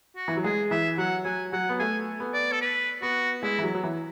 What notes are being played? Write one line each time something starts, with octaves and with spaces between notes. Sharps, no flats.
F#4
E3
F#3
G#3 G#4
E3 E5
F#3 F#5
F#3 G#5
F#3 F#5
B3
A3 G#5
B3
D5
A4
B4
B3 F#4
G#3 E4
E3
F#3
F#3
E3